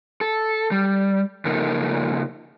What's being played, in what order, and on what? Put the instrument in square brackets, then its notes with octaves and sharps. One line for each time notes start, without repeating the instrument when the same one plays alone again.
[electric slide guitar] A4
G3
C#3 F3 A#3 D#4 A4 A#4